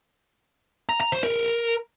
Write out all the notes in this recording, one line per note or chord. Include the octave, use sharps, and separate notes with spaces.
A#5
A#5
C5
A#4